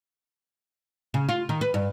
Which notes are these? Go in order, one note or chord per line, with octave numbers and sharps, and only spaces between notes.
C#3
F4
D#3
B4
G2